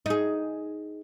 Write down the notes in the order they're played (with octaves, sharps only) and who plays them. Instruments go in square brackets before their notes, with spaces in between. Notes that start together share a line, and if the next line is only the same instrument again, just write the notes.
[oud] D#4 G#4